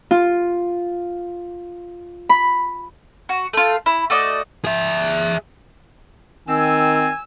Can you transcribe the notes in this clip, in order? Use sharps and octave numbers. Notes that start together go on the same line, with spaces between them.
F4
B5
F#4
A3 F4
E4
A3 F#4 D5 D#5
G#4 E5
D#3 C4 G#5 E6